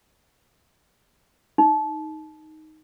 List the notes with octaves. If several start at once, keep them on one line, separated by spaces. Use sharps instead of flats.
D#4